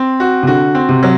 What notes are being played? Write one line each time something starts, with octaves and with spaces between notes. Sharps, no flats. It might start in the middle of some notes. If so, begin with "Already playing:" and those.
Already playing: C4
F#4
C3
D3 F#4
C4
C3
F#3